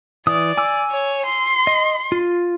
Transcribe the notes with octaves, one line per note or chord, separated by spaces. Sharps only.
E3 D5 D#6
G#5 D6 E6
C#5
C6
D#5
F4